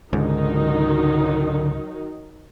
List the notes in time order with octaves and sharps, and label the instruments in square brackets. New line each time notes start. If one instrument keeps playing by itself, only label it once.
[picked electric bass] C#2 G#2 [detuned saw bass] D3 [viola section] D#3 F#3 D#4